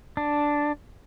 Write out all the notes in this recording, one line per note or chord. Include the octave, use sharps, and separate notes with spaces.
D4